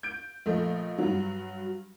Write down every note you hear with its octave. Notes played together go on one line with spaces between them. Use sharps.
G6 D7
A#1 A3 D#5
G2 F#3